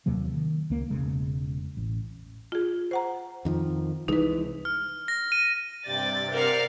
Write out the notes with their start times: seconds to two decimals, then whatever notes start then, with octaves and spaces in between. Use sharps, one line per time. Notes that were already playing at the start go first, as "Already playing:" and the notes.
0.06 D#2 C3 F#3 A#3
0.35 D#3
0.70 C#2 A#3
0.90 E1 C#3 G#3
1.77 A1
2.52 F4 G#4
2.91 C5 F#5 A#5
3.45 F2 D#3 F3
4.08 C2 E3 G#3 D#4 B4
4.65 F6
5.08 A#6
5.32 D#7
5.85 G2 C3 D5 G5 A6
6.33 A#4 C5 D5 F5 F#5